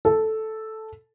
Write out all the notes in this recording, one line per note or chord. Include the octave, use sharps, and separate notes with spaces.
A4